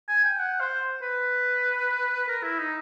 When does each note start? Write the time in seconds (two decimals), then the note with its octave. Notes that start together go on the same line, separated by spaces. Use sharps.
0.09 G#5
0.24 G5
0.39 F#5
0.60 C5
1.02 B4
2.28 A#4
2.43 E4
2.59 D#4